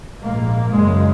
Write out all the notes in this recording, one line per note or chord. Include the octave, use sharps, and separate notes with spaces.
A#1 G#2 A#3
F#1 F#2 C#3 G#3